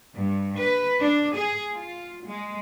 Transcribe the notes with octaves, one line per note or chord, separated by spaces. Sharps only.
G2
B4
D4
G#4
F4
G#3